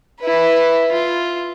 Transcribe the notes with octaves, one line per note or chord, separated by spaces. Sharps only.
E4 B4
F4